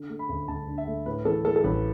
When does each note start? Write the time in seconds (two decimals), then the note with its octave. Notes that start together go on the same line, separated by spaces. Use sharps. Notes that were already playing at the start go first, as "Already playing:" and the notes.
Already playing: D3
0.09 A3
0.19 B5
0.29 D2
0.48 D2 A5
0.68 D3
0.78 E5
0.87 A3
1.06 A2 B4
1.25 E3 A4
1.45 A3 A4
1.56 A4
1.64 A1 B4